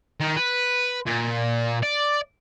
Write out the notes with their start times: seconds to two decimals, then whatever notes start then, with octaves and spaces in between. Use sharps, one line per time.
0.20 D#3
0.37 B4
1.07 A#2
1.83 D5